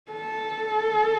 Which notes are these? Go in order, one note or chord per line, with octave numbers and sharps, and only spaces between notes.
A4